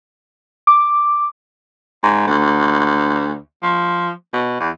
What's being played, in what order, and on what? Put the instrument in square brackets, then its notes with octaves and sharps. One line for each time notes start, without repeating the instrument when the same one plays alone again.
[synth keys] D6
[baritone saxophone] G#2
D2
F3
B2
E2